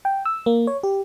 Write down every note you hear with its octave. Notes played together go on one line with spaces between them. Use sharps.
G5
E6
A#3
C#5
G4